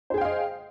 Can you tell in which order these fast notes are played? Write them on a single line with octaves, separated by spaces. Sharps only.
C5 G#4 G5 F5 D#5